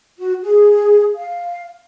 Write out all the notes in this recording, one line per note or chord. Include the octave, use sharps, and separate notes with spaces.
F#4
G#4
F5